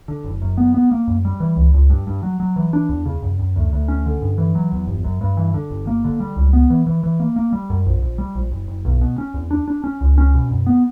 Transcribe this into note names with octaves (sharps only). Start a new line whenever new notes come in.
D3
F#1
F#2
B3
B3
A#3
F#2
G3
E3
C#2
C#2
G2
G2
F#3
F#3
E3
D4
E2
C#3
F#2
F#2
D2
D2
C#4
D3
G2
E3
F#3
E2
G1
F#2
G2
E3
D3
G1
A#3
D3
G3
C#2
B3
E3
E3
E3
A#3
A#3
G3
F#2
A#1
A#1
G3
A#1
F#1
F#1
B1
B2
C#4
E2
D4
D4
C#4
C#2
C#4
B2
F#2
B3